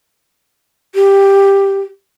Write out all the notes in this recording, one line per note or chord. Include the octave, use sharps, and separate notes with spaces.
G4